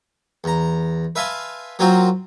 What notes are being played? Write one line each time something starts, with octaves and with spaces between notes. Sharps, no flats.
E2 A#5
B4 E5 F5 G#5 A5 C6
F#3 A#3 C4 F4 F#4 C5